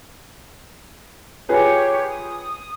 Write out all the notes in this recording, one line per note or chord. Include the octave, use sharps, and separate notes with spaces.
F4 G4 G#4 B4 C#5
D#6